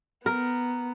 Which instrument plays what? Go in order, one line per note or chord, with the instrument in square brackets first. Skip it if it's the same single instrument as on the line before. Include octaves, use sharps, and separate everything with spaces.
[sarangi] B3 [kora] A#4